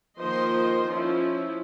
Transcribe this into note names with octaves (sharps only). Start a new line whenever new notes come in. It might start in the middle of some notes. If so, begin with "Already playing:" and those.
D#3 F3 A#3 C5 D#5 C6
F3 C#4 E4